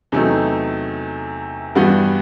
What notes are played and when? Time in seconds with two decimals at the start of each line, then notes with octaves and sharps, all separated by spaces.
0.12 E2 C3 F#3 A3 D#4
1.75 G2 E3 G3 B3 F#4